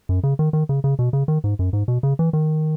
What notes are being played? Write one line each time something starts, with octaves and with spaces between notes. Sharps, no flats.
F#2
C#3
D#3
D#3
C#3
C#3
B2
C#3
D#3
G#2
F#2
G#2
B2
C#3
E3
D#3